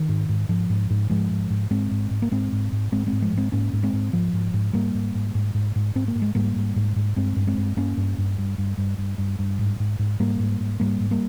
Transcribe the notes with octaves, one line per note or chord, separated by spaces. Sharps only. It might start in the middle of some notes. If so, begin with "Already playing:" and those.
Already playing: D#3
G#2
G#2
G#2 F3
G#2
G#2
G#2 F3 G#3
G#2
G#2
G#2 G#3 C4
G#2
G#2
A#3
G#2 G#3 C4
G#2
G#2
G#2 G#3 C4
G#3 C4
G#2
F3 G#3
G#2 G#3 C4
G#2 A#3 C#4
G#2
G#3 C4
G#2
G#2 F3
G#2
G#2
G#2 G3 A#3
G#2
G#2
G#2
G#2
G#2
G#2 C4
A#3
G#2
G#3
G#2 G3 A#3
G#2
G#2
G#2
G2 G#3 C4
G2
G#3 C4
G2
G2 A#3 C#4
G2
G2
G2
G2
G2
G2
G2
G2
G#2
G#2
G#2
G#2 G3 A#3
G#2
G#2
G#2 G3 A#3
G#2
G3 A#3